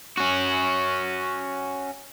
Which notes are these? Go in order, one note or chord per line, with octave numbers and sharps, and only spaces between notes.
C#4 F#4